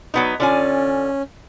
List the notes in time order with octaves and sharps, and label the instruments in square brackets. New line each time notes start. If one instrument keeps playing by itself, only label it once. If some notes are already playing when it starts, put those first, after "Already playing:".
[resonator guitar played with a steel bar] F#3 B3 D#4
[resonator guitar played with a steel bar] D3 F4 G#5 [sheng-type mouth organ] C#4